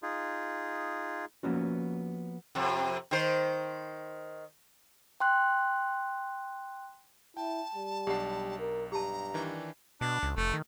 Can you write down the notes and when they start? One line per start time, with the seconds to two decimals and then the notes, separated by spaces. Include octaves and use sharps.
0.03 D#4 F4 G#4
1.43 F3 A#3 B3 C#4 F#4
2.55 F2 C3
3.11 D#3 C5
5.20 G5 C6 F#6
7.37 E4 G5 A5
7.75 G3
8.07 B1 D4 G4 F#5
8.59 A#4
8.92 G2 G4 A5 A#5
9.34 D#3 E3 D4
10.01 B2 D4
10.23 C#2
10.37 F1 A3
10.54 D#3